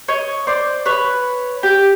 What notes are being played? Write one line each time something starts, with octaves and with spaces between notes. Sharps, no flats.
C#5 D#5
C5 D5
B4 C#5
G4